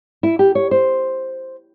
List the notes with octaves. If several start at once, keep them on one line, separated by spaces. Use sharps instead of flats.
E4
G4
C#5
C5